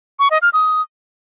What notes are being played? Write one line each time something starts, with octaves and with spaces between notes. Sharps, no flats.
C#6
D#5
F6
D#6